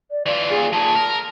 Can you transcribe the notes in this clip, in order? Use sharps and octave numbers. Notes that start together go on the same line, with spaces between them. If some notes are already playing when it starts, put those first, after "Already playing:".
D5
E3 F4 D5
D#2 F4 G#4
A#2 G#4 A5
A#4